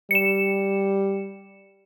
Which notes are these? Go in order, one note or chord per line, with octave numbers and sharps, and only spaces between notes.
G3 C#7 E7